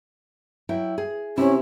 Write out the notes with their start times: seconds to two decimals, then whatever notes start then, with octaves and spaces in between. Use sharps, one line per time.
0.69 F#3 E4 G5
0.98 G#4
1.38 C3 C#4 E4